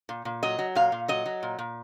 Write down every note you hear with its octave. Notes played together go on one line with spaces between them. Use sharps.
A#2
A#2
F#3 D#5
F#3
A#2 F5
A#2
F#3 D#5
F#3
A#2
A#2